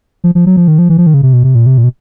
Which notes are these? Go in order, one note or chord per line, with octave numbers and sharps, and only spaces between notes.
F3
F3
F#3
F3
D#3
F3
E3
F3
D#3
C#3
C3
B2
C3
A#2
C3
A#2
B2